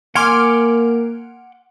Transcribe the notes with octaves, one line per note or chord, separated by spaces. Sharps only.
A#3 F#5 G#5 C6 D6 F6 D7